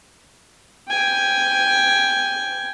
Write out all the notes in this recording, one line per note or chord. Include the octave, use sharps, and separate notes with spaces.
G5 G#5